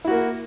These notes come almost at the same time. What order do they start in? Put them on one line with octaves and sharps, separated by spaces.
E4 F#4 A#3